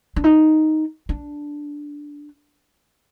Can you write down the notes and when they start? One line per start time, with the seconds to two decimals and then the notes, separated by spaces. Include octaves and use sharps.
0.16 D4
0.24 D#4
1.09 D4